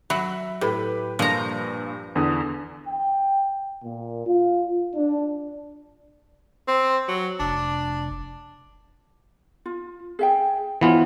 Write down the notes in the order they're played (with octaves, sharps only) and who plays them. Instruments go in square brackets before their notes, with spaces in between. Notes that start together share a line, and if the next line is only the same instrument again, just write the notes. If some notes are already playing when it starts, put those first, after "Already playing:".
[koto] F#3 [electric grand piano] E5 B5
[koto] A2 [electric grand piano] G4 B4 B5
[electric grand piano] G2 A#2 [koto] F3 A#5
[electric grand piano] E2 D3 D#6
[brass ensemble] G5
A#2
F4
D4
[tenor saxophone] C4
F#3
[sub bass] F1 [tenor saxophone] D4
[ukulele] F4
G#4 E5 G5
[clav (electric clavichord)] E3 B3 F4 [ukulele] F#4 C5 C#5